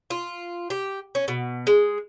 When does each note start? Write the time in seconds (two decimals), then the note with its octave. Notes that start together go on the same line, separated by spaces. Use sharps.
0.10 F4
0.70 G4
1.15 C#4
1.28 B2
1.67 G#3